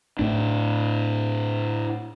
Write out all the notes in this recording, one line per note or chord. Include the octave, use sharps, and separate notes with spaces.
A2 D4